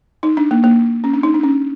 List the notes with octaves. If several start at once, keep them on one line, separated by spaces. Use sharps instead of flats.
D#4
D4
A#3
A#3
C#4
D4
D#4
D4
C#4